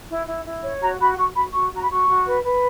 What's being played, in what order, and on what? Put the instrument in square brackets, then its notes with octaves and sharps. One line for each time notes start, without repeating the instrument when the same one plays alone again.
[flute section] E4
E4
E4
C#5
F#4 A#5
F#4 B5
F#4 C#6
F#4 B5
F#4 C#6
F#4 A#5
B5
F#4 C#6
F#4
B4
B4